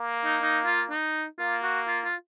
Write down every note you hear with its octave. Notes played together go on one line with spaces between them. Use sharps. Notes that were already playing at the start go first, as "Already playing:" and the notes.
Already playing: A#3
D#4
D#4
F4
D#4
A#3 F4
F#4
F4
F4